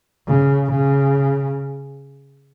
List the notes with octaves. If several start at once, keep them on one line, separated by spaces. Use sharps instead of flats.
C#3
C#3